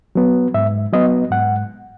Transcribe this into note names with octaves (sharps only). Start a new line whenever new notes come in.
F#3 B3
G#2 E5
F#3 B3 D#5
G#2 F#5